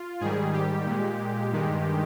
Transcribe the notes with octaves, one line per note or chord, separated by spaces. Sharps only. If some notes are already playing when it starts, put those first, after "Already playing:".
Already playing: F4
G#2 D#3 G3 G#4
G4
A#2 G#3
G2 D#3 G#3